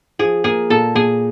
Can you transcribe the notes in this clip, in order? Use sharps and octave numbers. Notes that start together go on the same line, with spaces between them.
F3 G#4
A#3 G#4
A#2 A4
A#2 G#4